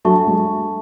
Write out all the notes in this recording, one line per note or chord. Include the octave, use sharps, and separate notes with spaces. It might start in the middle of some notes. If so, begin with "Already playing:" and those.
F#3 D4 A4 E5 A5 C#6
G#3